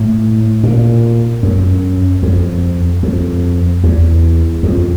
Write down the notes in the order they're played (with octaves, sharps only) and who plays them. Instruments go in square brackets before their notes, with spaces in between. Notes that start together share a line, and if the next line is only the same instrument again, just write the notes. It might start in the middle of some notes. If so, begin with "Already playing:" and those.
Already playing: [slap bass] A2
A#2
F#2
F2
F2
E2
F2